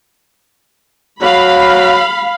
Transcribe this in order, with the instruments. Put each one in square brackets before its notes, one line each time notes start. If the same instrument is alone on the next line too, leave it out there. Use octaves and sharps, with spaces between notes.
[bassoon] F#3 [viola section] F5 B5